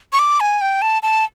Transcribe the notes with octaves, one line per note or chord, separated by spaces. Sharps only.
C#6
D6
G#5
G5
A5
A5